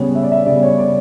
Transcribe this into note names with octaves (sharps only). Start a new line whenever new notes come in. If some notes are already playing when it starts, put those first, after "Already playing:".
Already playing: C#3 G3 B3 C#5
E5
D5
E5
C#3 G3 B3 D5
C#5
D5